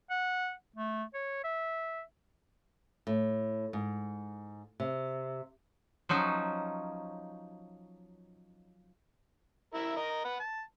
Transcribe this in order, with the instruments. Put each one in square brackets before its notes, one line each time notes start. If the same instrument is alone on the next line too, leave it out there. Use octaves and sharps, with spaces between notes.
[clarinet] F#5
A3
C#5
E5
[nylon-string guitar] A2
G#2
C3
[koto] F3 F#3 C#4 D#4
[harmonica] E4 A#4 E5
A#4 D#5
B4 F#5
A5